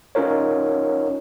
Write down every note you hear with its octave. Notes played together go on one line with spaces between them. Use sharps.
C#4 D#4 F4 A#4 C#5